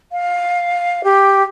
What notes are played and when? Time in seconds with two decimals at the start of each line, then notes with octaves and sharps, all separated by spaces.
0.12 F5
1.04 G4